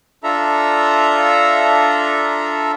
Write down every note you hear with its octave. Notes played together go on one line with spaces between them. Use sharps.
D4 F4 A4 E5 A#5